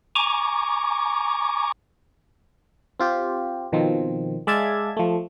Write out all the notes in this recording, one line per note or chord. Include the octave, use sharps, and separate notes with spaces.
G#5 A#5 C#6 D6
C4 F4 G4
B2 D#3 F3 C4
G#3 D5 E5 F5 A5 G#6
F3 A3